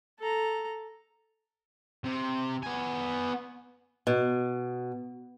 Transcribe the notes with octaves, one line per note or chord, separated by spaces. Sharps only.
A4 A#5
C3
B3 G#5
B2